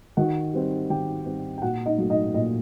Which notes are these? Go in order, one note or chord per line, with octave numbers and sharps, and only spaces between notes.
D#3 F#4 F#5
G3 C4
D#3 G4 G5
G3 C4
G5
A#2 F#4 F#5
D#4 D#5
F#3 A3 D#4
D#4 D#5
A#2 D#4 D#5